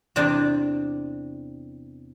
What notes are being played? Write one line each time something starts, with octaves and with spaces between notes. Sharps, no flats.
E2 C3 C4 D4 D5